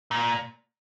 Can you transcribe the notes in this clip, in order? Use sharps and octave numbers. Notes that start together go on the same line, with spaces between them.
A#2